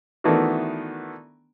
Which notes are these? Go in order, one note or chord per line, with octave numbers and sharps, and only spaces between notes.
D#3 E3 A3 B3 D4 F#4